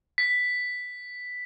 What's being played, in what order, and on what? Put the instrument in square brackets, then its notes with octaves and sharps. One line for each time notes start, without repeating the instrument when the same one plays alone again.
[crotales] B6